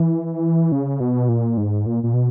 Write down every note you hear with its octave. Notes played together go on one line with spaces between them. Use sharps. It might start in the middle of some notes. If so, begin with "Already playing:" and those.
Already playing: E3
C#3
B2
A#2
G#2
A#2
A#2
B2